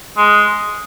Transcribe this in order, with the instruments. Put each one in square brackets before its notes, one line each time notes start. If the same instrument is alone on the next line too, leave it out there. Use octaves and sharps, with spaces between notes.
[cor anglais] G#3